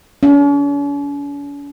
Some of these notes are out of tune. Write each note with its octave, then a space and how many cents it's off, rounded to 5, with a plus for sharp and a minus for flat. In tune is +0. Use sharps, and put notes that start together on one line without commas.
C#4 +45